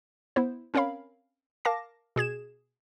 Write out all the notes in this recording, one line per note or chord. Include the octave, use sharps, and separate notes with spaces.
B3 E4 C5
C4 C#4 A#4 C#5 F5 B5
A#4 F5 A5 D6 A#6
B2 G#4 G#6 E7